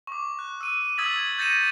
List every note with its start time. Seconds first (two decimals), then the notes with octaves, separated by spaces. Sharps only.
0.07 C#6 D6
0.39 F#6
0.61 E6 D#7
0.98 D#6 E6 G#6 A6 B6 F#7
1.38 G6 A6 A#6 C#7 D#7 E7